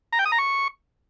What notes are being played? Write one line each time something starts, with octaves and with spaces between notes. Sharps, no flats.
A#5
G5
D#6
A#5
C#6